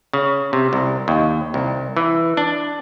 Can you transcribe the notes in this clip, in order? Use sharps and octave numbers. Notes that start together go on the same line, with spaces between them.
C#3
C3
C2
D#2
C2
E3
D4